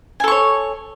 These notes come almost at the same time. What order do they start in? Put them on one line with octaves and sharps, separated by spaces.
G#5 A4 C#6 C#5